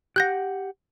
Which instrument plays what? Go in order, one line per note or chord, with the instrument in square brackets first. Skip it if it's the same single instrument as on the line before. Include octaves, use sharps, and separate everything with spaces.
[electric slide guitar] G4 F#5 [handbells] F#6 G6 A#6